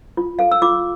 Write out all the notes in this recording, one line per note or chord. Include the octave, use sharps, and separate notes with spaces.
F4
A4 F5
E6
F4 D6